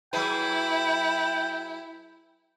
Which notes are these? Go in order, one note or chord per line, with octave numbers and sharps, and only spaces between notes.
F#3 E4 G#4 B4 G5